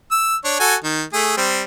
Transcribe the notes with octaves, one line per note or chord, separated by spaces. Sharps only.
E6
D4 C#5
F#4 A4 G#5
D#3
A3 G#4
G3 C4